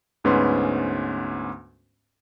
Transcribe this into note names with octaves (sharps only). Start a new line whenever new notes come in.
D2 G#2 B3 C#4 B4 C6